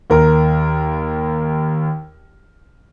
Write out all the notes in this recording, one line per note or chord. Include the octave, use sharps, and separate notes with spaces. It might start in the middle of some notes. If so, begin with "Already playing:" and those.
D#2 A#4